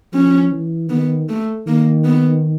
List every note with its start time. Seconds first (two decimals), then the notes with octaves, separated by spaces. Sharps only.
0.13 F3 C#4
0.52 E3
0.90 D#3 B3
1.29 A3
1.67 D#3 A#3
2.04 B3